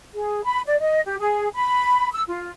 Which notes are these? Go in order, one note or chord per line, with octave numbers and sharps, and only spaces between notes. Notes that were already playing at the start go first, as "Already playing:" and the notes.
G#4
B5
D5
D#5
G4
G#4
B5
E6
F4